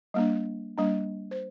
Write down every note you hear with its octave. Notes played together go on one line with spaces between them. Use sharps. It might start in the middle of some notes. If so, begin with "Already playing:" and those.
G3 A#3 D4
G3 A#3 D4
C5